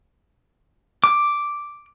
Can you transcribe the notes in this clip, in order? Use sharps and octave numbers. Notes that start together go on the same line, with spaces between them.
D6